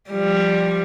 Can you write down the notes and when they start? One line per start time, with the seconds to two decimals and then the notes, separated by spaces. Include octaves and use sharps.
0.10 F3 G3